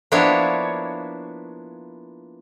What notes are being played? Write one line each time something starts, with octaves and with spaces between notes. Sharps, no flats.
F3 A#3 B3 D4 E4 C#5